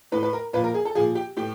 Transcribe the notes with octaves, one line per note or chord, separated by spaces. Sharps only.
A2 E3 B4
B4
A#4
A#2 F3 B4
A#4
G#4
A4
A#2 F3 G#4
G4
A2 E3 G4